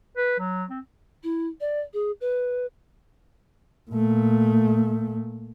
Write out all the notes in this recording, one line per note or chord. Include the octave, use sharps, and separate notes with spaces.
B4
F#3
C4
E4
D5
G#4
B4
A#2 A3